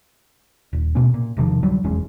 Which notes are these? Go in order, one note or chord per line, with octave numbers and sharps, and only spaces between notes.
D#1
B2 A3 C#4
A#2
E1 C3 D#3 F3
C#2 D3 F#3 G3
F1 E2 G#3 C#4